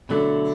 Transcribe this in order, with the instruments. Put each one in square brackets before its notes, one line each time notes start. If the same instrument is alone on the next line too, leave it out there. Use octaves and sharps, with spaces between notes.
[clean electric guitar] B2 F#3 A3 E4 [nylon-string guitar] D3